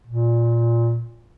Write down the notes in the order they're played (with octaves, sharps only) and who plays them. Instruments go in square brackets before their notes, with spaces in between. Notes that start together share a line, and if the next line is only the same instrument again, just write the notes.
[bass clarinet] A#2